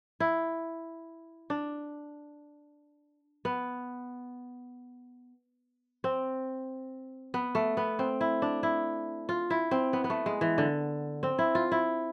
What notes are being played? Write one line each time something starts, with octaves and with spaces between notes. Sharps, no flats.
E4
D4
B3
C4
B3
A3
B3
C4
E4
D4
E4
F4
E4
C4
B3
B3
A3
G#3
E3
D3
C4
E4
F4
E4